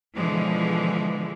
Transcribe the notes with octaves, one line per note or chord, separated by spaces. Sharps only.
B2 D3 E3 F3 G#3